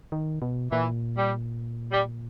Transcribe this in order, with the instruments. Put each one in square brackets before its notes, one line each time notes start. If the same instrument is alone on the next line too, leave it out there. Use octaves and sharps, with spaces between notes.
[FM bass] D#3
B2
[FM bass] A#2 [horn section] E3
[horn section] G3
G3